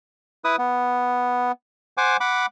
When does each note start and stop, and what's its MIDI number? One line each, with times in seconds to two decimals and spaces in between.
0.44 0.56 64
0.44 0.56 71
0.44 0.56 87
0.58 1.52 59
1.97 2.17 72
1.97 2.17 78
1.97 2.17 80
1.97 2.17 86
2.20 2.46 78
2.20 2.46 83
2.20 2.46 86